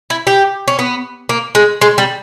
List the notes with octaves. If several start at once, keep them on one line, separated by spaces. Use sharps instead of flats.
E4
G4
C#4
B3
A#3
G#3
G#3
G3